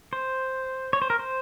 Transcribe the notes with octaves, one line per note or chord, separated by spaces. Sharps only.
C5
C#5
C5
A#4
C5